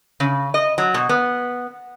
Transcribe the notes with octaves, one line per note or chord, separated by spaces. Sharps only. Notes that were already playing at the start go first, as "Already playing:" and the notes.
C#3
D#5
F#3
B2
B3